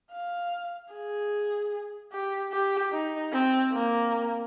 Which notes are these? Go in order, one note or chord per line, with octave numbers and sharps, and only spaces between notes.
F5
G#4
G4
G4
D#4
C4
A#3